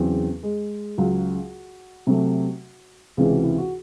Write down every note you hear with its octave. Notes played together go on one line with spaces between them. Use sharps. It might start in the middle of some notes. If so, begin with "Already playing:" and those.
Already playing: E2 C#3 F#3 C4
G#3 G#4
C#2 C#3 F#3 F#4
C3 F#3 A3
C#2 C3 E3 G#3 G#4
F#4
E4
F#4